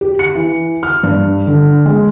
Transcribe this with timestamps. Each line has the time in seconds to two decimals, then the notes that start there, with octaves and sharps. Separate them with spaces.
0.01 G4
0.19 C#7
0.35 E3
0.83 F6
1.03 G2
1.47 D3
1.86 G#3